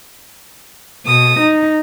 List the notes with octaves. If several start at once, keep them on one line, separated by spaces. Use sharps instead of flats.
B2 D#6
D#4